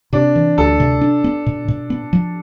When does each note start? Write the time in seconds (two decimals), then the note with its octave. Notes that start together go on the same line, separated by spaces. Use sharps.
0.13 C3 D4
0.36 E3
0.58 D2 A4
0.80 C3
1.01 D4
1.24 B3
1.46 B2
1.68 B2
1.90 B3
2.13 F3